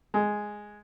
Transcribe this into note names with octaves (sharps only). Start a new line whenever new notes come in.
G#3